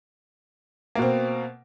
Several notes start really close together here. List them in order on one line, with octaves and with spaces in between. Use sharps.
A#3 B2 C4